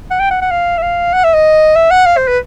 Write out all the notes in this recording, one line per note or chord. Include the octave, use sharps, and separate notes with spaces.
F#5
G5
F#5
F#5
F5
E5
F5
F#5
E5
D#5
E5
F#5
F5
C5
B4